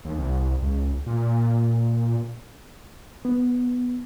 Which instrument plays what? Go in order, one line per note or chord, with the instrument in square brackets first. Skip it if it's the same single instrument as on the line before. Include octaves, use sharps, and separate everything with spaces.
[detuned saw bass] D#2
C2
C#2
A#2
[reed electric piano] B3